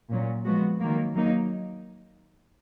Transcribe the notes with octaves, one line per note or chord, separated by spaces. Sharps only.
A#2 F#3 C#4
F3 G#3 B3 F#4
D#3 F#3 A#3
F#3 A#3 D#4